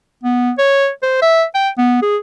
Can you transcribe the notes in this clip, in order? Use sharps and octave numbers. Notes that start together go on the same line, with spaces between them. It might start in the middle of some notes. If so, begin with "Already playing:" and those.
B3
C#5
C5
E5
G5
B3
G#4